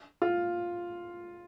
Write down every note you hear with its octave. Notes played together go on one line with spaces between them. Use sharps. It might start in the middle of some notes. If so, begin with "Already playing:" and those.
F4